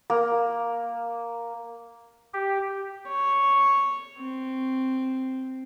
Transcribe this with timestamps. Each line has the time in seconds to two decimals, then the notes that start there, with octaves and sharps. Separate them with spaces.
0.10 A#3
2.33 G4
3.07 C#5
4.19 C4